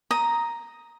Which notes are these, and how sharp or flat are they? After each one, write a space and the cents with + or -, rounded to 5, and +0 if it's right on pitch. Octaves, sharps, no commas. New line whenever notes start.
A#5 +0 D#6 +10